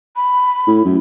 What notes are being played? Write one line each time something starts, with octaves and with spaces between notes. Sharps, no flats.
B5
A2
F#2